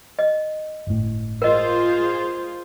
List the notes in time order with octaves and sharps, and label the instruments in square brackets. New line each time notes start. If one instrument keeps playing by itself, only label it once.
[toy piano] D#5
[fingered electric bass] G1 A2
[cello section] F4 G#4 C5 [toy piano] A#4 D#5